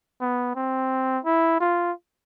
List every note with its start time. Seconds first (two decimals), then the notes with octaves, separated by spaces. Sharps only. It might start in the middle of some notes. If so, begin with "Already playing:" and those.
0.21 B3
0.56 C4
1.25 E4
1.60 F4